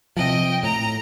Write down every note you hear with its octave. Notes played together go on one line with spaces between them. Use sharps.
C3 F3 D#5 G5
A2 A#5